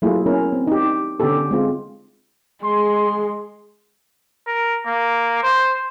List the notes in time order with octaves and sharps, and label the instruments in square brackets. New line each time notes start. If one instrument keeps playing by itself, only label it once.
[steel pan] F#3 A3 A#3 E4 F4 G#4
B3 C#4 E4 A#4
C4
D#4 G4
D3 B3 C#4 G4 A4
G#3 C4 F4
[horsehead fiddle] G#3 [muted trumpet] C6
[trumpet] A#4
A#3
C5